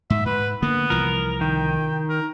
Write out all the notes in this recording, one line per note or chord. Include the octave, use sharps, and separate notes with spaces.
G#2 E5
G#2 B4
D3 A#3 B3
C2 E3 F3 A#4
D#3 G5
A#4